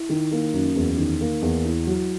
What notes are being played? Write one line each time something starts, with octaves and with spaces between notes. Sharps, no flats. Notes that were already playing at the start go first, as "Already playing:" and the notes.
Already playing: E4
D#3
A#3
F#2
E2
D#3
A#3
E2
E4
F#3